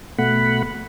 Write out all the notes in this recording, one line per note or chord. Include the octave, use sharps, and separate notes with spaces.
B2 A3 F#5 B5